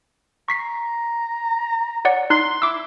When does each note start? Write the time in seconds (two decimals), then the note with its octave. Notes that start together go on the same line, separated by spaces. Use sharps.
0.48 A#5 C#6 B6 C7
2.05 C#5 D5 F#5
2.30 D#4 C6 F#6
2.62 E4 D6 E6